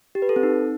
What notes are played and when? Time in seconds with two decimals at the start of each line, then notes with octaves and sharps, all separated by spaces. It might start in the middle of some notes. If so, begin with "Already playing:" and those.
0.15 G4
0.22 B4
0.29 A4
0.36 C4
0.43 D#4